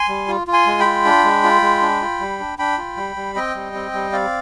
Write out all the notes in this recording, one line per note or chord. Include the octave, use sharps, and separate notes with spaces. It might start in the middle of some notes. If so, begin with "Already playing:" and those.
Already playing: G#5 C6
G3
F4
F4
G#5 C6
G#3
G5 B5
F4
D4
G#3
F4
G#3
D4
F4
G3
D4
D4 G5 B5
F4
G3
G3
C4 D#5 G5
G3
C4
G3
C4 D5 F5